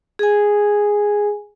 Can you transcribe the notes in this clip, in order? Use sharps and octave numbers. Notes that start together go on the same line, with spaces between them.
G#4 G#5